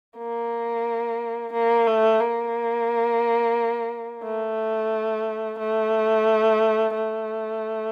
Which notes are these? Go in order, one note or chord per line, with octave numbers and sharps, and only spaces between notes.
A#3
A#3
A3
A#3
A3
A3
A3